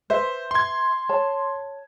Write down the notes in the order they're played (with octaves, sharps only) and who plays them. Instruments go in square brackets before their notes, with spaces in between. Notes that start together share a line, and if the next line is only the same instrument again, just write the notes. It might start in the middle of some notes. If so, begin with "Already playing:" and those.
[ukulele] B4 E5 [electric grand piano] C5
[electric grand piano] C6 G#6
[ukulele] C#5 A5